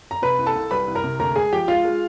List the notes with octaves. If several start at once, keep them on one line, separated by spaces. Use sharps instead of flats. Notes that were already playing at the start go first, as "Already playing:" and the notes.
A#5
C3 B4 B5
C2
A4 A5
C2
G3 B4 B5
C2
A#4 A#5
C3
D2 A#4 A#5
G#3 G#4 G#5
F3 G4 G5
G#3 F4 F5
G#3